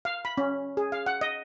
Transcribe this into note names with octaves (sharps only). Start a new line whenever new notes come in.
F5
B5
C#4
G#4
F5
F#5
D#5